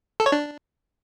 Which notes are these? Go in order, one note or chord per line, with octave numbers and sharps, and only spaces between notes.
A4
C#5
D4